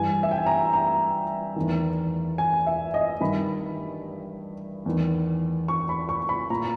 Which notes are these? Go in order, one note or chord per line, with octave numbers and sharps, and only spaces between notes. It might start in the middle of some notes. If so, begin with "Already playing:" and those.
Already playing: G2 E3 G#5
E5
G5
G#5
A#5
A#5
E2 D#3
G#5
E5
D#5
G2 D#3 B5
E2 D#3
C#6
B5
C#6
B5
A#2 A#5